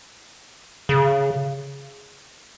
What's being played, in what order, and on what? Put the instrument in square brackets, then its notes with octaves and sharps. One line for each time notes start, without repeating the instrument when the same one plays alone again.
[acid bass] C#3